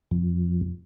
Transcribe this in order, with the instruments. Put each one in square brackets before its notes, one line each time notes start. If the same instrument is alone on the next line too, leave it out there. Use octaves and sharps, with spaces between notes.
[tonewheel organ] F2